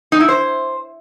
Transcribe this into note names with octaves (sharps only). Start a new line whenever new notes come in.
D#4
E4
C5